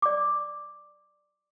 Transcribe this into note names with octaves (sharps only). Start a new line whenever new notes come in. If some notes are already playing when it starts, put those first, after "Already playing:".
D5 D6